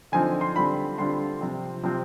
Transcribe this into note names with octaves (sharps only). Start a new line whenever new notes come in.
D3 F3 C4 D#4 G#5
C6
D3 G3 C4 F4 B5
D3 G3 C4 F4 C6
C3 F3 C4
C3 F3 C4